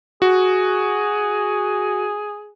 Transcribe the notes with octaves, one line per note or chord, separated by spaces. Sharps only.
F#4 G#4